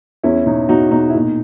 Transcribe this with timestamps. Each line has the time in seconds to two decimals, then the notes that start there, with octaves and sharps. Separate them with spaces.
0.24 E2 C#4 E4
0.46 B2 D#4
0.69 B2 D#4 F#4
0.91 B2 D#4
1.10 E4
1.14 A#2 D#4